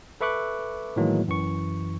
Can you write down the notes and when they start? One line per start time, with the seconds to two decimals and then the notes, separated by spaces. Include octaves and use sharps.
0.21 A4 B4 E5 C#6 D6 F#6
0.96 A2 D#3 E3 F#3 G#3 A#3
1.28 F#2 E3 C#6